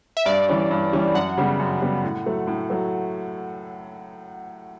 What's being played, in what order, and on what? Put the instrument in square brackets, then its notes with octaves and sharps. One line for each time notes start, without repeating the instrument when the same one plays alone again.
[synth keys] E5
[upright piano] G2 [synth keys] D5
[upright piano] E3 G3 C#4
G2
E3 G3 C#4
[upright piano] F#2 [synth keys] F#5
[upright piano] C#3 G3 B3
F#2
C#3 G3 B3
A2
F#3 A3
A2
F#3 A3